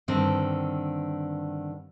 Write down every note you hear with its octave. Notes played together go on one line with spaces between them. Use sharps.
G2 D3 D#3 C4